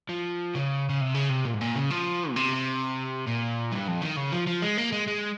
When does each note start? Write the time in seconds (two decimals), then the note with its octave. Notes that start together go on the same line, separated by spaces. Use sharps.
0.09 F3
0.55 C#3
0.89 C#3
1.01 C3
1.15 C#3
1.30 C3
1.45 A#2
1.54 G#2
1.61 A#2
1.75 C#3
1.90 F3
2.31 A#2
2.36 C3
3.27 A#2
3.72 G2
3.88 F2
4.02 D#3
4.17 C#3
4.33 F3
4.47 F3
4.62 G#3
4.78 A#3
4.93 G#3
5.08 G#3